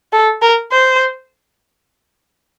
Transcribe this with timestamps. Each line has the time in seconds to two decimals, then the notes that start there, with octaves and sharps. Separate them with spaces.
0.13 A4
0.42 A#4
0.72 C5